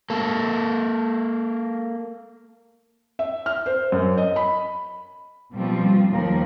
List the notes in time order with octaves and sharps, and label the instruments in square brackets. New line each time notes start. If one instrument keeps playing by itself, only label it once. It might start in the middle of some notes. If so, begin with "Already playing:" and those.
[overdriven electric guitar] A#3 A4
[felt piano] E5
F6
C5
F#2
D#5
B5
[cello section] B2 F3 G3 A#3 C4 F4
D#2 F3 A#4